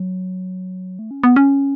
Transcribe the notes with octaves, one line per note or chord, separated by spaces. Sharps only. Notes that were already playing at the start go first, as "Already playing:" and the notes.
Already playing: F#3
A3
C#4
B3
C#4